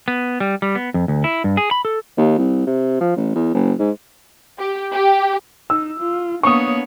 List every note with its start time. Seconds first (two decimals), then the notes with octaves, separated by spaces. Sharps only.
0.08 B3
0.40 G3
0.62 G3
0.75 B3
0.94 F2
1.08 D2
1.24 E4
1.44 G2
1.57 G#4
1.71 B5
1.85 A4
2.17 D#2
2.38 C2
2.67 C3
3.00 F3
3.16 A1
3.36 E2
3.54 F#1
3.79 G#2
4.59 G4
4.93 G4
5.70 D#4 E6
6.00 F4
6.43 A#3 B3 D4 C#5 C#6 D#6